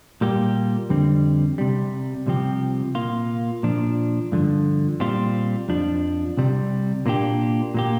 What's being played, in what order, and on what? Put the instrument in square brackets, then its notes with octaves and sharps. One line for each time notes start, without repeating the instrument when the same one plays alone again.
[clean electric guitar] A#2 G3 A#3 G4
F2 D3 G3 C4
C2 C3 G3
C2 C3 F3 C4 G4
A#2 A#3 F4
A#2 F3 D4
G2 D3 F3
A#2 G3 C4 F4
F2 F3 D4
C2 C3 G3
A#2 A#3 D4 G4
A#2 A#3 G4